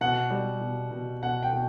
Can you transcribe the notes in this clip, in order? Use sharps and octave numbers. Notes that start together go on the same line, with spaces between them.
B2 F#5
G3
B2
B2
B2 F#5
G5
B2